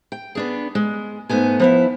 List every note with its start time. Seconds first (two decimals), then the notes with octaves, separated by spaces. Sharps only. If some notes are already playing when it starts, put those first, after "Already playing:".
0.12 G5
0.35 B3 D4 G#4
0.75 G#3
1.29 G#2 A3 B3 G#5
1.60 F3 B3 E4